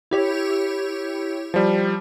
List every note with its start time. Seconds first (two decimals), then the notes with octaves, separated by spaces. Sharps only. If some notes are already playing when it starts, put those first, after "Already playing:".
0.11 E4 G4 C#5
1.54 F3 G3